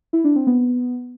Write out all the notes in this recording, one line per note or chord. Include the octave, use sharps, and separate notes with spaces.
E4
D4
C4
B3